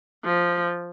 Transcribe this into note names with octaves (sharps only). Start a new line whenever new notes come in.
F3